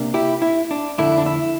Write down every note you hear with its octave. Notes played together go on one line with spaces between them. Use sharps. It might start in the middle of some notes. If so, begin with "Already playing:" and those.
Already playing: C3 A#3 D4
E4 G4
E4
D4
F2 D3 A3 D4 E4
D4
E4